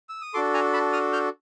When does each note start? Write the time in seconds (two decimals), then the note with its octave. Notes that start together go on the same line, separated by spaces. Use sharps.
0.09 E6
0.21 D#6
0.34 D4 F#4 A4 C6 D6
0.54 G#5 A#5
0.73 A5 B5
0.93 D#6 F6
1.13 F6 G6